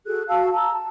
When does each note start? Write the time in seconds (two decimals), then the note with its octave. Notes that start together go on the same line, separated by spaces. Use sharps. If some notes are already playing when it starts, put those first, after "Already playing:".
0.06 F#4 G#4 A4 F#6
0.27 F#4 F5 A5 E6
0.53 A5 A#5 E6
0.73 A5